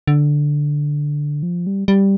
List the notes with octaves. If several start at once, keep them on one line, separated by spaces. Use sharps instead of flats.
D3
F3
G3
G3